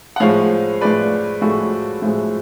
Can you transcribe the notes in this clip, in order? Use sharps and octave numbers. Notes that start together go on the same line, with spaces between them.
F#5
A2 F3 G#3 C#5 F5
A2 F3 G#3 B4 D5
A2 F3 G#3 F#4 A4
A2 F3 G#3